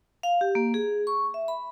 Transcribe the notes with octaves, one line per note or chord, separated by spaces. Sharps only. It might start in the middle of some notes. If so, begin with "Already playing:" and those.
F5
G4
A#3
G#4
C#6
E5
B5